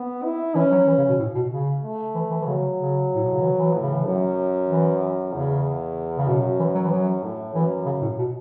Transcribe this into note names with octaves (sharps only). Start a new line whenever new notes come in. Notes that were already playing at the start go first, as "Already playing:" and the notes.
Already playing: B3
E4
E3 C#4
F#3
E3
C#3
B2
A2
B2
C#3
A3
E3
E3
E3
C#3 F#3
C#3
A2
B2
C#3
E3
E3
A2
C#3
E3
F#2 F#3
E3
E2 C#3
C#3
F#2 B2
E3
F#3
E3
F#2 F#3
A2
F#2 E3
C#3
A2
B2